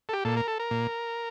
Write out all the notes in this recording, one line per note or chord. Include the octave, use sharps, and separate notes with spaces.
A4
G4
A#2 A4
A#4
A4
A#4
A#2